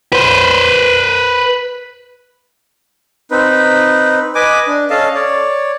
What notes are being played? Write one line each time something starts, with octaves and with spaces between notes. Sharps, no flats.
B4 C5
C4 D#4 B4
B4 D#5 G#5 D6
D4
C#4 A4 D#5 F5 A5
C#5 D5